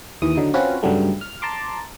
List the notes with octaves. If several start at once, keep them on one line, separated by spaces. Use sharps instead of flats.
D#2 E3 D#6
D3 F#3 D#4
C4 C#4 F4 F#4 B4
G2 C#3 F#3 G3 A3
F6
A5 A#5 C6 D6